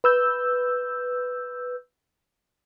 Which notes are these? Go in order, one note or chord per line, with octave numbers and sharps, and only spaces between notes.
B4 E6 G6